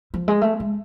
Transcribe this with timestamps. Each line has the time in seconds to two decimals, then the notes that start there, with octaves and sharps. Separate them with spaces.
0.14 F3
0.28 G#3
0.41 A3
0.60 G#3